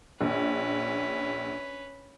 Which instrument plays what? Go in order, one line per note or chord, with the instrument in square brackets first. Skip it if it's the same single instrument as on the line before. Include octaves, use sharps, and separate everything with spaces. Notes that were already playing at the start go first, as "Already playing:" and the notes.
[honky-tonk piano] A#1 [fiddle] C#4 B4